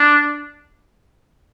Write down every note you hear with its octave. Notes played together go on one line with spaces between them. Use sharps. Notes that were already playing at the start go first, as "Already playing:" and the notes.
Already playing: D4